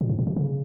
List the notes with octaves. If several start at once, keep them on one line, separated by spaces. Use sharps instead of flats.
A#2
G#2
A#2
B2
C#3